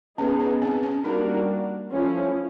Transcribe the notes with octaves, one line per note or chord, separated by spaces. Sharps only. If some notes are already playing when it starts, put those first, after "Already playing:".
B3 C#4 D#4 G#4
C#4
C4
C#4
G3 A#3 D4 D#4 F#4 A#4
F3 A3 C#4 E4